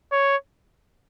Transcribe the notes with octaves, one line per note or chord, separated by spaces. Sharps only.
C#5